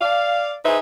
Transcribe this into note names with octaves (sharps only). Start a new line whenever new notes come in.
D5 F5
D#4 G#4 B4 C5 E5